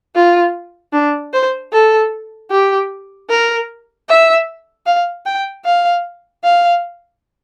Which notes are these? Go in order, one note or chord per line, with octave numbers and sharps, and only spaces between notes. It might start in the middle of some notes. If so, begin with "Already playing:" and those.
F4
D4
C5
A4
G4
A#4
E5
F5
G5
F5
F5